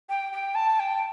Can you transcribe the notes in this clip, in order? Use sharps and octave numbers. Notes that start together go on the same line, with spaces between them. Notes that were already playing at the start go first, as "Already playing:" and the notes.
G5
G5
A5
G5